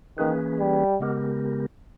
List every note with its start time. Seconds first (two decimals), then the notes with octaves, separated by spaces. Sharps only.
0.18 D#3 E3 A#3 C#4 G#4 B4
0.60 G3
1.00 C#3 G#3 B3 G4 A#4